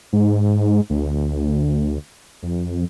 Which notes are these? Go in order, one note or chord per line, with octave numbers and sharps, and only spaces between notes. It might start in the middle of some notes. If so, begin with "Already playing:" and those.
G#2
D2
F2